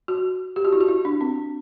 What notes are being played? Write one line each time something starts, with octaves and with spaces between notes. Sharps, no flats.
F#4
G4
F#4
E4
F#4
E4
D4
C4